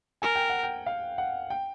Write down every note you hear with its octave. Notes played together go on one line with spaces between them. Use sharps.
A#4 G#5
G5
F#5
G5
F5
F#5
G5